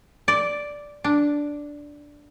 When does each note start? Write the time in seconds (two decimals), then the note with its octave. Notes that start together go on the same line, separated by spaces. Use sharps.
0.28 D5
1.04 D4